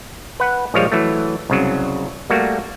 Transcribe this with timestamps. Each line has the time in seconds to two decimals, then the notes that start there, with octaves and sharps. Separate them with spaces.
0.40 B4 F#5
0.74 A#1 F3 G3 G#3 C#5 F5
0.92 E3 F#3 A3
1.50 C2 C#3 F#3
2.30 G3 A3 A#3 F#4